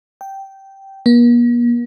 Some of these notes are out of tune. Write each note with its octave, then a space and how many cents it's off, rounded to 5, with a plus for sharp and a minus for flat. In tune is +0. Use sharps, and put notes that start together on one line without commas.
G5 -10
A#3 +45